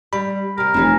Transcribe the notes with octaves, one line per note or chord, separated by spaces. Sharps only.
G3 B5
C3 G4 A#4
F1 E3 C#4 B4